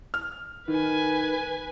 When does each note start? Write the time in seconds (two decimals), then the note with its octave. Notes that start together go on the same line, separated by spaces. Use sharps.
0.14 F6
0.68 D#3 B4 G#5